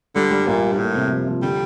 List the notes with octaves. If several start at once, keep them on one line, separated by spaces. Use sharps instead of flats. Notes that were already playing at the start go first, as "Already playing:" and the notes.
D3 G3
G3
A#1 A#2
G3
G2
A2 A#3
C3
F3
F3
D3 G3